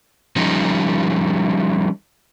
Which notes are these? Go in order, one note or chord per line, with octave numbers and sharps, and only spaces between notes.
F3 G3 C#4 D#4